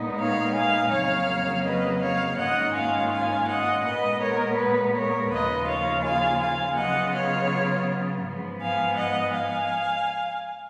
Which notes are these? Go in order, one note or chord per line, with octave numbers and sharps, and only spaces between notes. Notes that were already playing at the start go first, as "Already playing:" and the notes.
Already playing: A#2 G#3 B3 D#4
C#5 F5
F5 G#5
F2 C#3 F#3 A#3 C#5 F5
B4 D#5
C#5 F5
G#2 D#3 A#3 C#4 F4 D#5 F#5
F5 G#5
F5 G#5
D#5 F#5
A#2 G#3 B3 B4 D#5
A#4 C#5
B4
A#4 C#5
D#2 C#3 F3 A#3 F4 B4 D#5
C#5 F5
F5 G#5
F5 G#5
C#3 F#3 B3 F4 D#5 F#5
C#5 F5
G#2 F3 B3
F5 G#5
D#5 F#5
F5 G#5